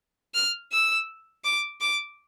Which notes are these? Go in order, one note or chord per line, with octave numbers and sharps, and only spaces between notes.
F6
E6
D6
D6